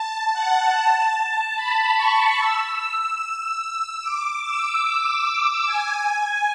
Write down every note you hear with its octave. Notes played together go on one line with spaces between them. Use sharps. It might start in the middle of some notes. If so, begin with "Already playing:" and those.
Already playing: A5
F#5
A5
A5
B5
C#6
E6
D6
E6
G#5